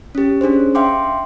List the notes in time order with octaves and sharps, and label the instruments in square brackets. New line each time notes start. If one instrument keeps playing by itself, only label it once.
[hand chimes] C#4 G4
C#4 D4 G#4 C5
E5 F5 G5 C6 D6